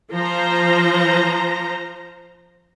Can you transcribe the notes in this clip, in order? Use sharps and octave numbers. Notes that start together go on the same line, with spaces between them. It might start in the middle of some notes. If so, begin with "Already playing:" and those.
F3 C5 A#5